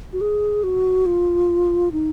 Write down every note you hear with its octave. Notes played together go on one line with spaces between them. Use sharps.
F#4
G#4
F#4
F4
D#4